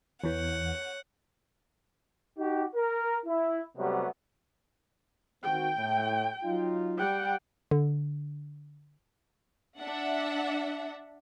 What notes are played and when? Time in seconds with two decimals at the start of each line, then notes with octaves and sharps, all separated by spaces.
0.24 E2 E3 C#5 F#5 C#6 G6
2.37 D#4 F#4 G4
2.75 A#4
3.26 E4
3.76 C3 F#3 G3 A3 B3
5.44 D#3 C4 F#4 G5
5.78 A2
6.44 F#3 D#4 F4
6.98 G3 F#5 G5
7.71 D3
9.79 D4 E5 F#5